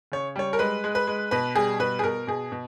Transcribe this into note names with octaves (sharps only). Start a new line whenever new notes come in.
C#3 C#5
G3 C#5
A#4
G#3 B4
G#3
B4
G#3
B2 B4
G3 G#4
B2 B4
G#4
B2 A#4
B2 G#4
B2